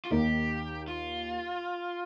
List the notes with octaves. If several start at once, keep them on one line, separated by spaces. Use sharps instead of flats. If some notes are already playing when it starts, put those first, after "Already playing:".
F4
D#2 D#3 A#3 D#4 G4
F4